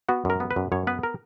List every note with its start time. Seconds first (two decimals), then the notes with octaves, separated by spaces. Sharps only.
0.09 B3 F#4
0.25 F#2 A#4
0.40 B3
0.51 B4
0.56 F#2
0.72 F#2 C#5
0.87 B3 B4
1.03 A#4